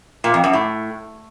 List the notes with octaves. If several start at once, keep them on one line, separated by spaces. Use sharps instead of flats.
A#2
F2
F#2
A2